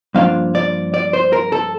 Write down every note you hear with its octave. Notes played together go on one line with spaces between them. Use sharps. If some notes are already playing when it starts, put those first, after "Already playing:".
G2 F3 A#3 D4 F4 F5
D5
D5
C5
A#4
A4